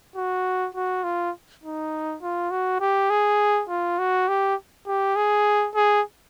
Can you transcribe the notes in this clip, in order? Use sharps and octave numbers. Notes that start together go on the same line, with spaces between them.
F#4
F#4
F4
D#4
F4
F#4
G4
G#4
F4
F#4
G4
G4
G#4
G#4